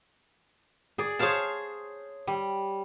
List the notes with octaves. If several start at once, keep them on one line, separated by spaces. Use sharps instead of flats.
G#4 D5
G#4 C5 C#5 F5 A5
G3